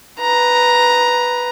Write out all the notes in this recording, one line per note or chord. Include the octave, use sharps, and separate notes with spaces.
B4 A#5